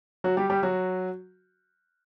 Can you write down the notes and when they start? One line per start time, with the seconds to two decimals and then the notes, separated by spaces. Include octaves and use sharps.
0.24 F#3 F#4
0.37 G3 G4
0.50 G3 G4
0.63 F#3 F#4